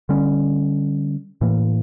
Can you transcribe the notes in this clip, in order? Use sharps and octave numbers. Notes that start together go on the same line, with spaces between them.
D3 G3 C#4
A2 E3 A#3